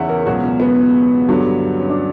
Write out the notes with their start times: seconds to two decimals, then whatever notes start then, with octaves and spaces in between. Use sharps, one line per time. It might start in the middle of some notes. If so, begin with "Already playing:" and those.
Already playing: E2 C#3 E3 C#5 E5 F#5
0.09 A#4
0.26 C#2 B2 F#3 F#4
0.44 C#4
0.60 B3
1.29 G2 D3 F#3
1.79 C#4
1.89 D4